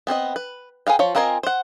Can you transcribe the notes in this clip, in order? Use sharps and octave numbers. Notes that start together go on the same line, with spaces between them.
B3 C4 C5 D#5
B4
G#4 B4 F5 G5
F3 F4 C#5
C4 F4 A#4 D#5 G#5
C5 F#5